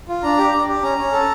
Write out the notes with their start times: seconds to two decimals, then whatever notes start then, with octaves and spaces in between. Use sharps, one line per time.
0.09 F4
0.23 D4 A#5
0.38 G4
0.52 D4
0.68 G4
0.82 C#4 A#5
0.98 C#4
1.13 A4